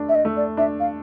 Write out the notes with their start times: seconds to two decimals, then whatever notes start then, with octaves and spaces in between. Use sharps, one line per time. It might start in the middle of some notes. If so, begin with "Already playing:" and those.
Already playing: A3 D4
0.09 E5
0.15 D#5
0.25 A3
0.37 D5
0.57 D4 E5
0.80 F5